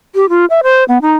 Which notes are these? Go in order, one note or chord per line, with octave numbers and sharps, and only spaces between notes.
G4
F4
E5
C5
B3
D#4